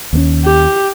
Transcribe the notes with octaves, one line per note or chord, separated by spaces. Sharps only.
D#2 A#3 C#4
G4